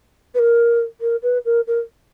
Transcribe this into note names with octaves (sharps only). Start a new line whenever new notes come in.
B4
A#4
A#4
B4
A#4
A#4